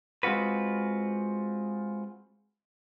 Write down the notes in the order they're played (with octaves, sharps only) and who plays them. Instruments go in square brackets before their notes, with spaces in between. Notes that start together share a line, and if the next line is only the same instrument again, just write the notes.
[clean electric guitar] G#3 C4 F4 F#4 B4